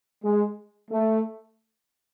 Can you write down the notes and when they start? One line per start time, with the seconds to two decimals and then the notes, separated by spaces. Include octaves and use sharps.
0.24 G#3
0.91 A3